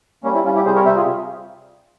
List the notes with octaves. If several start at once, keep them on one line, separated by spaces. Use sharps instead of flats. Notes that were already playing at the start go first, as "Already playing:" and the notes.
G3 A#3 C#4
C4 E4
G3 C#4 F4
E4 G4
C3 G#4 C5
A#4 C#5
C3 C5 E5
F4 G#4